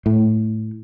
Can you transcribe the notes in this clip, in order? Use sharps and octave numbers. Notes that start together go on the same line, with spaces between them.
A2